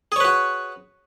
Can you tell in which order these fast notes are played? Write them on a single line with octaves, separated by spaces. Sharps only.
G#4 C#5 B4 F#4